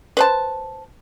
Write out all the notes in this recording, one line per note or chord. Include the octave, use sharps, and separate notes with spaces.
B4 C5 A5